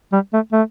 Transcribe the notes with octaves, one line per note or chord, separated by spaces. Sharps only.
G3
A3
A3